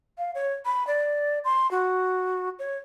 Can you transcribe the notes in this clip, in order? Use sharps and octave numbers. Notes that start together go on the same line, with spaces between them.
F5
C#5
B5
D5
C6
F#4
C#5